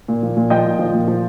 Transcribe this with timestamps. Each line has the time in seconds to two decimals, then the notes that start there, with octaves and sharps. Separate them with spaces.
0.08 A#2
0.23 F3
0.37 A#2
0.50 F3 D#5 G5
0.65 A#2
0.79 F3
0.94 A#2
1.08 F3